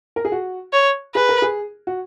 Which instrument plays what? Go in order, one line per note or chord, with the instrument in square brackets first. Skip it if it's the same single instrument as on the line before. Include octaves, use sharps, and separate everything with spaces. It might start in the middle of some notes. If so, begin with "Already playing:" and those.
[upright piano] A#4
G#4
F#4
[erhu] C#5
[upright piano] G#4 [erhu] B4
[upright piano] A#4
G#4
F#4